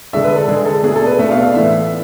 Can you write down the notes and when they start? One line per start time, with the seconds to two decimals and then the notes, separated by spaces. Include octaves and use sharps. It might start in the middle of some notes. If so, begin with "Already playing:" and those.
0.13 D3 G#3 D4 E5
0.24 B4
0.36 A4
0.48 D3 G#3 D4 G#4
0.65 A4
0.83 B2 A3 D4 G#4
0.96 A4
1.07 B4
1.18 B2 A3 D4 E5
1.31 F5
1.43 F5
1.54 A2 E3 B3 D4 E5